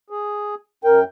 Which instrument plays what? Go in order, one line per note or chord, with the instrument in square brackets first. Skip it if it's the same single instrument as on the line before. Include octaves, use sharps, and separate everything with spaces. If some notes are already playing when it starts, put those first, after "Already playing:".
[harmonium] G#4
[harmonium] F#2 G5 [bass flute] A#4